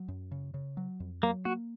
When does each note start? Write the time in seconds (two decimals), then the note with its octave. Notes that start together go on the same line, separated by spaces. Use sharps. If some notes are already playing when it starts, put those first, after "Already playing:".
Already playing: F#3
0.08 F#2
0.31 C#3
0.54 C#3
0.77 F#3
1.00 F2
1.23 F#3 A#3
1.45 A#3 F#4